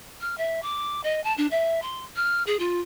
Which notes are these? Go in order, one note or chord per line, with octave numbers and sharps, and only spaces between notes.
F6
E5
D6
D#5
A5
D4
E5
C6
F6
G#4
F4